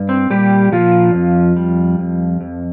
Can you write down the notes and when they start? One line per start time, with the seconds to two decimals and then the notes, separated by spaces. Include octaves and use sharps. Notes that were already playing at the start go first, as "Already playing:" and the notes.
Already playing: G2
0.09 C4
0.30 A#2 G3 G4
0.72 A#2 F3 F4
1.14 F2
1.56 G3
1.99 F2
2.41 F2